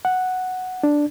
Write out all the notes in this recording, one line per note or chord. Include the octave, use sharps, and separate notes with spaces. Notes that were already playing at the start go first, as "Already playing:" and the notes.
F#5
D4